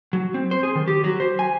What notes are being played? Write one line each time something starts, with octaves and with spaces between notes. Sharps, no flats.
F#3
C4
C5
G#4
D#3
G4
F#3
C5
G#5